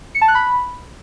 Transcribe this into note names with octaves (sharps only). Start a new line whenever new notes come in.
C#7
A5
F#6
B5